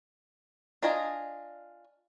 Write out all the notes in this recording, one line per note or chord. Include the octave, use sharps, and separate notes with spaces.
D4 F4 D#5 G#5 A#5